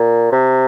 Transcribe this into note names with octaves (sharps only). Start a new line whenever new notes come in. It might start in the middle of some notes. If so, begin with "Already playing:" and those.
Already playing: A#2
C3